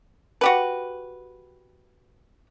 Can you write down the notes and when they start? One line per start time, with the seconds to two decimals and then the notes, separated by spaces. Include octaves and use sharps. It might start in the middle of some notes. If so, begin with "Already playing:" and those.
0.41 F#4 G4 B4